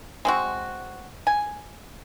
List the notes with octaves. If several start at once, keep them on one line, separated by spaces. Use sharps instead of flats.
G#3 C4 F#4
G#5